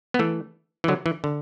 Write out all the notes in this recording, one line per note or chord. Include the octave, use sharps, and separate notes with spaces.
B3
E3 A3
E3
D3 F#3
E3
D3